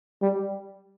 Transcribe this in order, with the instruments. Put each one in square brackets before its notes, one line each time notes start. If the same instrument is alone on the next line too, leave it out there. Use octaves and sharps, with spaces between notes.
[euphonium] G3